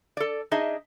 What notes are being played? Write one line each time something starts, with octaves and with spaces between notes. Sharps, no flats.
A4 D5
D4 D#4 G#4 D#5 E5